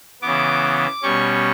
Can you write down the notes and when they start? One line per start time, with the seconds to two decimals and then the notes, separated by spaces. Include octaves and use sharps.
0.22 C#3 E3 B3 D6
1.02 B2 G3 C#4 C#6